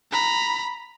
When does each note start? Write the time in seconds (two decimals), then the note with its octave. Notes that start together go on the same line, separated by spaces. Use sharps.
0.12 A#5 B5